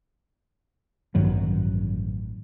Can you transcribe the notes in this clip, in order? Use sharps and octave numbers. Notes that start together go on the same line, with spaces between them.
A1 G2 D#3 F#3